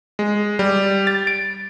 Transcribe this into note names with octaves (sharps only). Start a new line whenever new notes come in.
G#3
G3
A6
D7